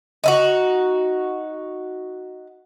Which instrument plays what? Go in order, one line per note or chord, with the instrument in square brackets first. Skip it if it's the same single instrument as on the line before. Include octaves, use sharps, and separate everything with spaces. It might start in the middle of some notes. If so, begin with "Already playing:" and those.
[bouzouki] D#4 E4 F#4